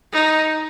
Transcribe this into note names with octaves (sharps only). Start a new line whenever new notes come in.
D#4